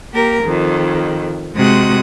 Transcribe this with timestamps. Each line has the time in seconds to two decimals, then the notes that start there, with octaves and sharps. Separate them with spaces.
0.13 A#3 G4 A#4
0.44 F2 D#3
1.56 C3 G#3 F#4 D#6 F#6